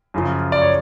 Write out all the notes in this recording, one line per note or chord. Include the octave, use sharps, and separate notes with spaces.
F#2 C#3 F3
D5
C#5